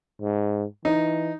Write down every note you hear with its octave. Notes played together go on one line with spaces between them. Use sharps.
G#2
E3 D#4